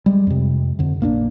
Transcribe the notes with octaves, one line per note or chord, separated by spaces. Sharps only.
G3 G#3
F2 C3
F2 D3
A#1 A#3 C4 D4